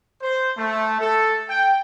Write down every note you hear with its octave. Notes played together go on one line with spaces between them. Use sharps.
C5
A3
A4
G5